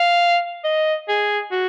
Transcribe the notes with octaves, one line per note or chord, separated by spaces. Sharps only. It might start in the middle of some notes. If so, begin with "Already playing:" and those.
Already playing: F5
D#5
G#4
F#4